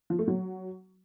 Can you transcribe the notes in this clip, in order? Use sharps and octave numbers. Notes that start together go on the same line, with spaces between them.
F3
A3
F#3